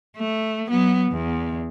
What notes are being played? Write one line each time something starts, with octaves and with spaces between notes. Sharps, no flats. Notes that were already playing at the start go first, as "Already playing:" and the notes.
A3
F#3 B3
E2